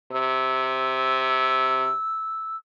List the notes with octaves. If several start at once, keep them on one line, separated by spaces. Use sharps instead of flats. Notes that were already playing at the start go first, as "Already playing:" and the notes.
C3 E6